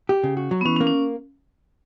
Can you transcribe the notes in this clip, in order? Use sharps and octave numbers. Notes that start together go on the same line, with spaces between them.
G4
C#3
F#4
F#3
B3
E3 C#4
C#4
A#3
C#4